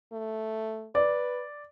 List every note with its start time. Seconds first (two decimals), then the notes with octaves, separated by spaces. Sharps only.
0.13 A3
0.95 B4 D5